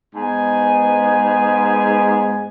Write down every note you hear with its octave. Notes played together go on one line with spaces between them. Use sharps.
G#2 B3 G#5